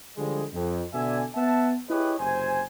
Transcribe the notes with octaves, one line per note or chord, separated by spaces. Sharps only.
D3 F3 G3 G#3
F2
B2 D3 D5 E5 G#5
B3 E5 F#5 A5
E4 G4 G#4 B4 C#5 D#5
F#1 C3 C4 C5 G#5